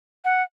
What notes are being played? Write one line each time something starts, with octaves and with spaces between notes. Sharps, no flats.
F#5